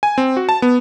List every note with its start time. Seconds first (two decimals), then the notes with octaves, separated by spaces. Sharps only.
0.03 G#5
0.18 C4
0.37 F#4
0.49 A5
0.62 B3